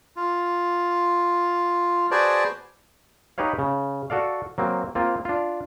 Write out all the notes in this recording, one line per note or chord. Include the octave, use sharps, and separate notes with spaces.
F4
F#4 G#4 B4 C5 D5 A5
D#4 G4 B4 C#5 F5
C#3
F#4 A4 D5 F5
F#3 A#3 C4
A#3 C4 F4
D4 F4